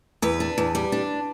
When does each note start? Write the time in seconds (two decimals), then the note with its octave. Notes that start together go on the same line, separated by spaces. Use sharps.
0.22 E2 B4
0.40 D4
0.58 E2
0.75 G3
0.92 D4